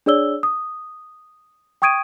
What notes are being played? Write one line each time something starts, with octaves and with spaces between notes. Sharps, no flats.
D4 G#4 C#5 D5 E6 G7
D#6
G5 C#6 D#6 G#6 D7 D#7